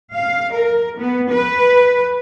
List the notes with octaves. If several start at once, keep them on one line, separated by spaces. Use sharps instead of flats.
F5
A#4
B3
B4